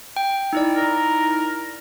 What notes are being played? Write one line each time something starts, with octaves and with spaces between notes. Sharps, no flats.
G5
D#4 E4 D5
A#4